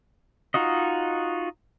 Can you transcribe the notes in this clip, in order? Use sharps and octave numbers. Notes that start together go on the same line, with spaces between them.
D#4 F4 F#4 D#5